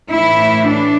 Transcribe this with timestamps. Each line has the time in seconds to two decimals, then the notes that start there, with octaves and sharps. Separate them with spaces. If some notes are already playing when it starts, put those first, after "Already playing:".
0.10 A2 E3 E4
0.67 D4